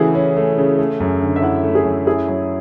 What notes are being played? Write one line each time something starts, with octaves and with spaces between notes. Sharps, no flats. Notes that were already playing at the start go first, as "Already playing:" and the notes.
Already playing: C#3 E3 A3 E4 F#4 G#4
C#4
A3
C#3
A3
F#2
D3
E5
E4 F#5
A3
G#4
F#2
E4 G#4
F#3